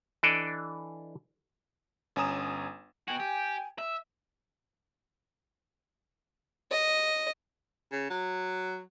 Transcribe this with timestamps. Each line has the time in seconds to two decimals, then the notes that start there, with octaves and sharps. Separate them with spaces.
0.23 E3 D4 A4 D5 D#5
2.16 G1 C#4 G#5 A#5 D#6 E7
3.08 B3 F#4 G5 G#5
3.20 G4
3.78 E5
6.71 D#5
7.92 C#3
8.10 F#3